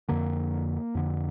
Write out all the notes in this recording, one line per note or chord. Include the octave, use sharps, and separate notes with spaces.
F2 D3 A#3
F2 D3